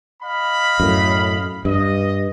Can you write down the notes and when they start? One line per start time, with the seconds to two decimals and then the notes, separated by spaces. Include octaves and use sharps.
0.22 D#5 F5 B5
0.80 F#2 A2
1.65 G2 D#5